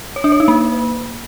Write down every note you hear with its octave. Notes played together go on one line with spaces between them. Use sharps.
C#5
D4
C#5
D#4
A#3